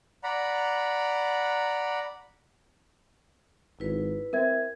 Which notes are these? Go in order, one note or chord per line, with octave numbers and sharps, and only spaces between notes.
D5 F#5 A#5 B5
G#1 E4 B4
C4 A#4 E5 G#6